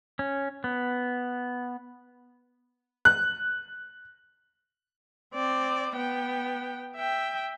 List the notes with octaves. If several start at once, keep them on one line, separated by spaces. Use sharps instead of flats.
C#4
B3
F#6
C4 D5
B3 G5
E5 G5